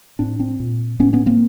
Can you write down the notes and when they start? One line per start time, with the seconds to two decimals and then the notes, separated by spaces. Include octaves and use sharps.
0.19 A2 C4 D4
0.39 C4 D4
0.60 A#2
0.99 A2 B3 C#4
1.13 B3 C#4
1.26 A#3 C4